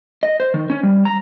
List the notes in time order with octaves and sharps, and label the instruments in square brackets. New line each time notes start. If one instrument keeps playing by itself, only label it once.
[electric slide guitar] D#5
C5
D#3
C#4
G3
A#5